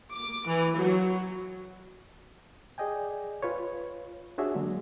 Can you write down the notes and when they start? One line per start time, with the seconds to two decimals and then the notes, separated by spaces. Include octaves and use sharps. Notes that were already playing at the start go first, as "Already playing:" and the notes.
0.12 D6
0.46 E3
0.79 F#3
2.78 G#4 D5 D#5 G5 G#5
3.42 F4 B4 C#5
4.38 D4 F#4 G#4 C#5 E5
4.54 D3 F#3 G#3 A#3